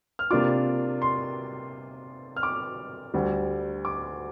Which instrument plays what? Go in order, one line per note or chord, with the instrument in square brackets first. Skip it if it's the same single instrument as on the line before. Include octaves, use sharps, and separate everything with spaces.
[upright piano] F6
C3 A#3 D4 F4 D6
C6
F6
D6
D2 D3 G3
D6